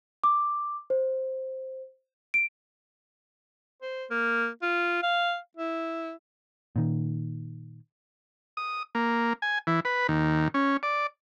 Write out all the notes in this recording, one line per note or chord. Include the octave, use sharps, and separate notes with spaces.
D6
C5
D7
C5
A#3
F4
F5
E4
A#2 D#3
D#6
A#3
G#5
E3
B4
D#2
C#4
D5